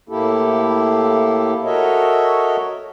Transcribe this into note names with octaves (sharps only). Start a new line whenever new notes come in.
A2 A#3 E4 G4 A4
F#4 A4 A#4 C#5 D#5 E5